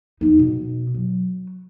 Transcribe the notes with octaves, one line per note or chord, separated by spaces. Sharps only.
E2 D#4
B2
F#3